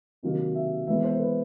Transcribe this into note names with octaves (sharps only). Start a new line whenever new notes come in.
C3 D#3 F#3 A#3
E5
E3 G#3 B3 E5
C5
B4